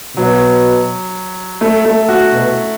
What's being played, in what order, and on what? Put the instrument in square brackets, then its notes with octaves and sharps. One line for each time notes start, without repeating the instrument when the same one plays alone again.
[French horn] B2 [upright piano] F#3
[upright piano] A3
A3
F#4
[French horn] B2